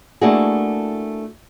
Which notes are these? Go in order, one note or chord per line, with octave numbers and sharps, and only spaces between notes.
A3 A#3 D4 E4 F#4 G#4